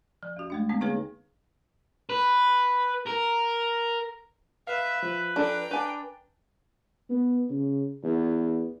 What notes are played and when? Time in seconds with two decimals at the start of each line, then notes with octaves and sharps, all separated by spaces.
0.23 F3
0.36 E2 F#4
0.50 G#3 A3 D4
0.69 D3 G#3 B3 C4
0.81 A#3 D#4 G#4 B4 C#5 F5
2.09 B4
3.07 A#4
4.67 B4 E5 F5
5.03 F3
5.36 D4 A4 G5 A#5
5.71 D4 B4 G#5
7.10 B3
7.50 C#3
8.03 E2